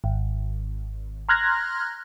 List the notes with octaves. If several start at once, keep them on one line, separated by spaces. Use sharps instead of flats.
G#1
A#5 C6 F6 F#6 G#6 A#6